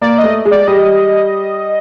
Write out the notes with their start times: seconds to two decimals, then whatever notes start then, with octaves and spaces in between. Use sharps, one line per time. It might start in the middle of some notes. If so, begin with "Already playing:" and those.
0.01 A#3 D5
0.18 D#5
0.24 A3
0.45 G#3
0.51 D5
0.67 G3 D#5